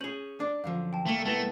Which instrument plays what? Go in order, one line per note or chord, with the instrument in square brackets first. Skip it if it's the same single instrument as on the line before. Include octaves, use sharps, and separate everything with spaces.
[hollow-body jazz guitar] C#4 G#4 [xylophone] G6 F#7
[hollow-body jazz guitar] D4 D5 [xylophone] D6
[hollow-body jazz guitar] F#2 D3 F3 [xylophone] F5
[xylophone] G5 A5
[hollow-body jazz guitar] C2 A#3 [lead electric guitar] A3
[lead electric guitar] A3 [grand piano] B3 E4 [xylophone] A5 A6 A#6